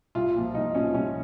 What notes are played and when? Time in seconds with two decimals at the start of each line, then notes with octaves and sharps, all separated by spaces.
0.15 C2 F4
0.35 A#2 F3
0.55 C2 D#4
0.74 A#2 F3 C#4
0.94 C2 C#4